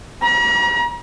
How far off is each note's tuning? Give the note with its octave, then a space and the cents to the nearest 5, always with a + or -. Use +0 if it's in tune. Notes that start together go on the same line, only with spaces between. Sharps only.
A#5 +45